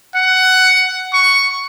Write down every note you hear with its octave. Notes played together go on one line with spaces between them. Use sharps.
F#5
C#6